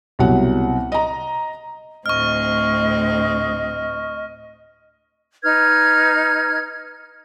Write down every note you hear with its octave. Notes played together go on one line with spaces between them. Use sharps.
C2 B2 F#3 F#5
D#5 A#5
D2 A2 C4 D#5 C#6 F6
D#4 B4 F6 G#6